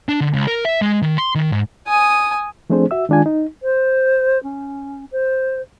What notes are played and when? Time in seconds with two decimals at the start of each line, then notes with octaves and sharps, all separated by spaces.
0.09 D4
0.21 D3
0.34 C#2
0.47 A#4
0.65 E5
0.82 G#3
1.02 D#3
1.18 C6
1.35 D#3
1.52 G#2
1.88 G#5 D#6
2.70 F3 A3 C4 D4 G#4 C5
2.91 F#4 E5 E6
3.09 D#3 G#3 D4 F4 G#5
3.26 D#4
3.62 C5
4.43 C#4
5.12 C5